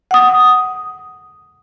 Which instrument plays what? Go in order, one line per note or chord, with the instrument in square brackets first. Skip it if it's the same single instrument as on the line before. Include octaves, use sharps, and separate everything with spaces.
[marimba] F#5 D#6